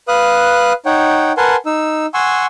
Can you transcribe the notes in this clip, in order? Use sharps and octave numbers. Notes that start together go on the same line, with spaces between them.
B4 F5 D#6 F#6
D#4 C#5 F#5 G5
A#4 B4 F#5 G#5 A5 C6
D#4 E6
F#5 G#5 C6 C#6 E6